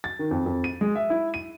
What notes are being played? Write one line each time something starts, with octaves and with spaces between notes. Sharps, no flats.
A6
D#3
F2
F2
D#7
G#3
E5
E4
D#7